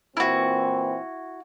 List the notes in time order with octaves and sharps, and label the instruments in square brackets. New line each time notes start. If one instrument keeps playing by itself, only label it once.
[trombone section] A#2 E3 C4 [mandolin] E4 F#4